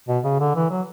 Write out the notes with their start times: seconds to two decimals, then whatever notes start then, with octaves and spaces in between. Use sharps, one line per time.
0.08 B2
0.24 C#3
0.40 D3
0.56 E3
0.71 F#3